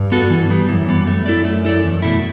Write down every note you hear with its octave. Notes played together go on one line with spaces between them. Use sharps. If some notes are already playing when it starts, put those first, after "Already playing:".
Already playing: G2
B3 F#4 A4
E3
G3 B3
F#2 E3
G3 B3
F#2 A3
E4 A4 D5
A3
E4 A4 D5
E2
B2 A3 E4